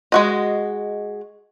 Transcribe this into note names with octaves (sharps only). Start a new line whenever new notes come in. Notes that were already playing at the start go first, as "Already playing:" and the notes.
G#3 F#4 D#5